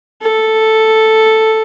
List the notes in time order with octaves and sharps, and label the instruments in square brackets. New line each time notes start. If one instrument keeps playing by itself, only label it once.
[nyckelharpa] A4